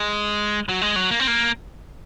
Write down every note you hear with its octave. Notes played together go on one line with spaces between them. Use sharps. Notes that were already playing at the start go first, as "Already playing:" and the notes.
Already playing: G#3
F#3
G#3
F#3
A#3
C4
A#3